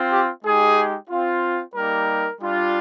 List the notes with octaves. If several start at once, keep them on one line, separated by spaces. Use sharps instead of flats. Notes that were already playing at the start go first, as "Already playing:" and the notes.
Already playing: C4 F4
G4
G#3 D#4 G4 G#4
C4 F4
G3 A#3 D#4 G4 A#4
G3 D4 F4